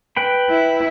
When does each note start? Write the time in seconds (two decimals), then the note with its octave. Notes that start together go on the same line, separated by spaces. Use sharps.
0.16 B4 G5 B5
0.50 E4